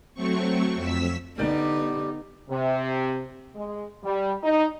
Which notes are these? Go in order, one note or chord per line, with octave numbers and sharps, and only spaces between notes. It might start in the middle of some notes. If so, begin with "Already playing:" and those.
F#3 A3 C4 C#6
F2 E6 B6
D3 G3 B3 D#4 D5
C3
G#3
G3
D#4